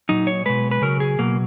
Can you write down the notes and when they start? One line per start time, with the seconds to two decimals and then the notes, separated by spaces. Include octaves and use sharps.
0.09 A#2 F#3 D#4
0.27 C#5
0.45 B2 G#3 B4
0.71 B4
0.82 C#3 F#3 A#4
1.00 G#4
1.19 B2 F#3 A#3